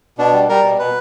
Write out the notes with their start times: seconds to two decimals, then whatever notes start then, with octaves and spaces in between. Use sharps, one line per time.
0.18 B2 D4
0.33 G3
0.49 G3 A#4
0.63 B2
0.78 B2 B4